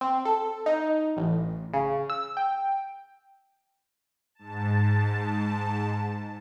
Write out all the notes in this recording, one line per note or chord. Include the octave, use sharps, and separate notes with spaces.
C4
A4
D#4
A1
C#3
E6
G5
G#2 A5